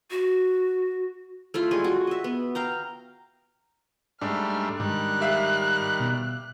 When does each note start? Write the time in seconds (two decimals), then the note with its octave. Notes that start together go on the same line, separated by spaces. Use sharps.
0.11 F#4
1.54 A3 E4 F4 C6
1.71 G3 G#3 G#4 D#5
1.84 F#4
2.07 D#5 E5
2.24 B3
2.55 F5 G5 A#5
4.21 G#2 G3 A3 D4 F6
4.80 G#2 D#3 G3 F#6
5.21 G4 E5 F5
6.00 B2